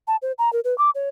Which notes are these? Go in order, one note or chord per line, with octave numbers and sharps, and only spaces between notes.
A5
C5
A#5
A#4
B4
D6
C#5